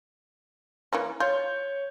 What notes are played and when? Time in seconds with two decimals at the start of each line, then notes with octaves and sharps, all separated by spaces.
0.93 E3 A#3 C#4
1.20 F4 C#5 G6